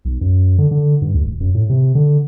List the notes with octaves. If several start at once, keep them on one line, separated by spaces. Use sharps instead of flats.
B1
F#2
D3
D3
G2
D2
D1
F#2
A2
C3
D3